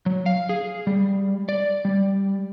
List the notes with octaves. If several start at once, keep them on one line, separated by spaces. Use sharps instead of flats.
F#3
F5
G#4
G3
D5
G3